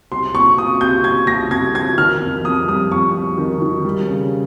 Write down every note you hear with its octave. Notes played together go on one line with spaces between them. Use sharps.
C2 C6
A#2 C#6
A#2 D#6
C2 G6
C2 G#6
C2 A#6
C2 G#6
F3 G#6
D#3 F6
F2
F2 D#6
G3 D#6
F2 C#6
F2
D#3
D#3
G3
C#3